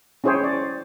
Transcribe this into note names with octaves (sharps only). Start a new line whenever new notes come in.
C#4 E4 G#4 C5 C#5 G5
D5